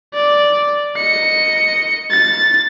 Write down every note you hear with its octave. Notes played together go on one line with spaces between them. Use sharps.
D5
D#5 C#7
A6